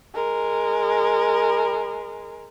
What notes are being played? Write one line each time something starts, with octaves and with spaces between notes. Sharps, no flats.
G#3 A#4